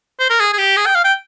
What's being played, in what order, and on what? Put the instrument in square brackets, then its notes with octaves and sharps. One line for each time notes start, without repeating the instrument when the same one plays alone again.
[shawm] C5
A#4
G#4
G#4
G4
G#4
G5
F5
G5